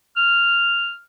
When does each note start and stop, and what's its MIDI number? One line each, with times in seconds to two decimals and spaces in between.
0.17 0.97 89